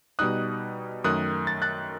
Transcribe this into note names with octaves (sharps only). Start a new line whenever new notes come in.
B2 G3 D#4 D#6 F#6
F#2 D#3 A3 D#6 F#6
A6
F#6 A6